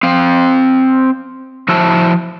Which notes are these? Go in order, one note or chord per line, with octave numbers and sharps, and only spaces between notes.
C4 F5
F3 E4 F#4 E5 A5